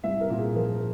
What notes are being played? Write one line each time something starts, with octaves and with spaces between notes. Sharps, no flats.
C2 E5
A#4
A#2
G#4
F3 A#4